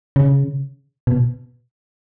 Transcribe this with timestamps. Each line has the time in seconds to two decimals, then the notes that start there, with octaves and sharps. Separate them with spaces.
0.16 C#3
1.07 B2